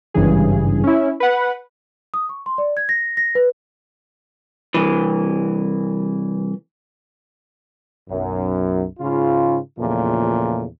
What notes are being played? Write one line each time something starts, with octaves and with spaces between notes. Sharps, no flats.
G#1 G2 C#3 E3 G#4
C#4 E4
B4 F#5
D#6
C#6
C6
D5
G#6
A#6
A#6
B4
C2 E3
B1 F#2
G#2 C#3 F4
E2 A#2 C#3 F3 A3